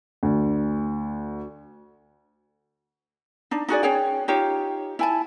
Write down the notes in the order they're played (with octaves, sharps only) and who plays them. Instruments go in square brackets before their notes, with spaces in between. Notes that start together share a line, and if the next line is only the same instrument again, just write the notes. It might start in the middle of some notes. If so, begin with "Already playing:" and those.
[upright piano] D2
[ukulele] D4 D#4
D#4 F#4 G#4 D5
C#4 G#4 C#5 G5
D#4 F4 G4 C#5
E4 G#5 A5